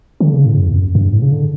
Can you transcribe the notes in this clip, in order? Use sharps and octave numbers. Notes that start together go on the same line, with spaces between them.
D3
C#3
A2
F#2
E2
F#2
F#2
G2
A2
C#3
D3